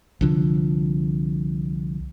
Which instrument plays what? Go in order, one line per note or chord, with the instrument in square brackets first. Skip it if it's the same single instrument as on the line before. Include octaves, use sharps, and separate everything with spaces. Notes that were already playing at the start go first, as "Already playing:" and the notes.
[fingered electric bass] C2 D3 F3